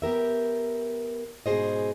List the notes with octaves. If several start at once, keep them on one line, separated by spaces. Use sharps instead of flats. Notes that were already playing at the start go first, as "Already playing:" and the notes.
B3 G4 A#4 E5
G#2 B2 G3 G#4 C5 D#5